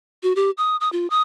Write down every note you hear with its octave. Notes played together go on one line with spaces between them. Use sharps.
F#4
G4
D#6
D#6
F4
D#6